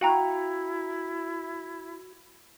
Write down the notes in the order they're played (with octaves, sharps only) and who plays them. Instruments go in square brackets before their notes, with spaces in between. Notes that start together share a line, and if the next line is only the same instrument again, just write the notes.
[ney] E4 [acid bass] F#4 [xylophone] F5 G5 A#5